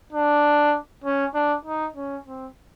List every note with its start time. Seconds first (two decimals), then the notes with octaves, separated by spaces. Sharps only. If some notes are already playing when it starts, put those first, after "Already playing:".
0.13 D4
1.04 C#4
1.34 D4
1.65 D#4
1.96 C#4
2.26 C4